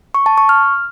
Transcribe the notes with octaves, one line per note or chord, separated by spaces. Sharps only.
C#6
A5
C#6
F6